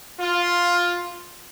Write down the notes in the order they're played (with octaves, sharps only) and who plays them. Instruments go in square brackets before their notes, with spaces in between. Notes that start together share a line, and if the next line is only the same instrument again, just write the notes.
[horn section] F4